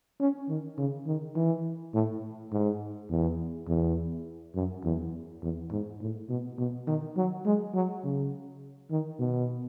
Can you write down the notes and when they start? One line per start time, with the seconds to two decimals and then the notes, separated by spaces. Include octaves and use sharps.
0.20 C#4
0.49 D#3
0.78 C#3
1.07 D#3
1.36 E3
1.94 A2
2.52 G#2
3.10 E2
3.68 E2
4.55 F#2
4.84 E2
5.42 E2
5.71 G#2
6.01 A2
6.30 B2
6.58 B2
6.87 D#3
7.17 F#3
7.45 G#3
7.75 F#3
8.04 C#3
8.91 D#3
9.19 B2